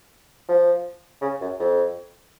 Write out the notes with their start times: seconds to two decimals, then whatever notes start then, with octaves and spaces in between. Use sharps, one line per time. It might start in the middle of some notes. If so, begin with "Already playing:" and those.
0.49 F3
1.22 C#3
1.41 F#2
1.60 F2